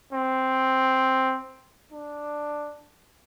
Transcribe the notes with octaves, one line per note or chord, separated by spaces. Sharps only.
C4
D4